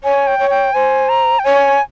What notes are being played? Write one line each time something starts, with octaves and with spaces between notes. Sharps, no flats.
C#5 G#5
G5
C#5
G5
C5 G#5
A#5
G5
C#5 G#5